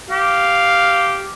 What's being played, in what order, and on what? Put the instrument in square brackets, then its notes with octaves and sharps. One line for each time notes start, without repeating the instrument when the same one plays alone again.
[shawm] G4 [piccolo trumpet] F5